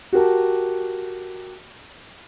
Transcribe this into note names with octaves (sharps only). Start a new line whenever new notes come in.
F#4 G4 A#4 A5